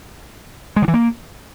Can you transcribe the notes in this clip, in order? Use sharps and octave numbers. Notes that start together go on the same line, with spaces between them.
G#3
D3
E3
A#3